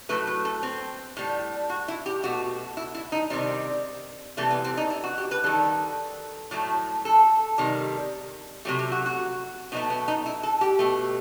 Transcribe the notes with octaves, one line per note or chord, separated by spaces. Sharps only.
A2 F#3 A3 B4
B4
A4
C4
A2 G3
F#4
E4
G4
B2 A3 F#4
E4
E4
D#4
C3 D#3 G3 C4
C3 E3 G3 A3
B3
C4
D#4
E4
F#4
G4
B4
D#3 G3 A4
A2 F#3 A3
A4
C3 D#3 G3
C3 F#3 A3 G4
G4
F#4
F#4
B2 F#3 A3 D#4
B3
D#4
E4
A4
G4
B2 A3